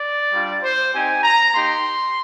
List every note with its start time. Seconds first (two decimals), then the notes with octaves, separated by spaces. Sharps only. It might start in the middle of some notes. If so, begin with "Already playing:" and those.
Already playing: D5
0.33 G3 D4 F4
0.63 C5
0.93 C4 D#4 G4 G#5
1.24 A#5
1.54 A#3 D#4 G4 C6